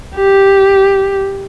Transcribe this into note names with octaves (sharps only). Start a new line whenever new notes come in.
G4